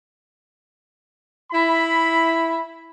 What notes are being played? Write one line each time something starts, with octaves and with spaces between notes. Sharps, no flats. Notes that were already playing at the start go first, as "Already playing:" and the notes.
E4 B5